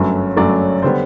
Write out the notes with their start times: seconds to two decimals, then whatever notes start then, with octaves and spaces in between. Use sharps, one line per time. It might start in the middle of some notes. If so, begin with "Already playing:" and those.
Already playing: G1 F#2 F#3 A3
0.37 G1 F#2 F#3 A3 D5
0.82 D3 G3 B3 C5